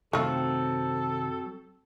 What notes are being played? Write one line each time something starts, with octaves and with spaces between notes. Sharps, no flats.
F#2 C3 D#3 F#3 A3 C4 F4 A4